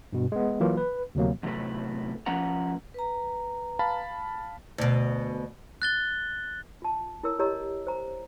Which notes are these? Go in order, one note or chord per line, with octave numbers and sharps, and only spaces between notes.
G2 B2
G#3 B3
E3 F#3 A#3 F4
B4
D2 C3 F#3 A#3
E2 A2 C3 F#3 A3 B4
F3 A#3 C#4 B4 F#5 A#5
B4 A#5
F5 A5 B5
D2 B2
F#6 A6 G7
F4 A5
E4 A#4 C#5 E6
E4 G4 C#5 D#5 A#5 E6
C5 A#5